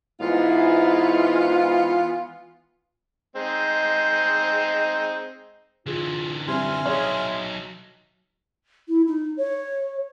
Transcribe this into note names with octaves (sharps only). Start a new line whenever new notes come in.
G#2 E3 B3 E4 F4
G#3 C4 D#4
D3 E3 F4 G#4
G3 C4 E5 G#5 C6 F6
F#3 D#4 G#4 C#5
E4
D#4
C#5